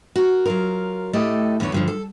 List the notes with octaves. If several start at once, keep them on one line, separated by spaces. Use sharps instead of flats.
F#4 A#4
F#3 F4 A#4
A2 A3 G4 A4 D#5
E2 D3 B3 C#5
G2 D3 F3
A4